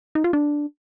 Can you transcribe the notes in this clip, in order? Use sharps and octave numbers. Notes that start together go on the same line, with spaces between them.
D#4
F4
D4